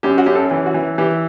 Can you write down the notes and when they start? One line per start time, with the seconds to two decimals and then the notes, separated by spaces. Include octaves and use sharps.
0.03 F#2 G4
0.18 F#4
0.26 F#2 G4
0.35 A4
0.51 E3
0.66 F#4
0.74 E3
0.98 E3 G4